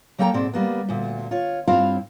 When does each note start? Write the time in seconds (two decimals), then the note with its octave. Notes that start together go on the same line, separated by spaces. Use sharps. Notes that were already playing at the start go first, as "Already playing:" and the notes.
0.18 F#3 A#3 A4 G5 G#5 A#5
0.34 G#2 B2 C4 D5
0.53 G3 A#3 B3
0.89 D2 A#2
1.31 F4 C#5
1.67 G2 C4 E4 F4 C5 F5